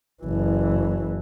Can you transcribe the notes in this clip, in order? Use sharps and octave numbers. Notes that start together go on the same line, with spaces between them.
F#1 E3